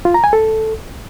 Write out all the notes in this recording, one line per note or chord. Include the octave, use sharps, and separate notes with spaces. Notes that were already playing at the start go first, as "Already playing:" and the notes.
F4
A#5
G#5
A4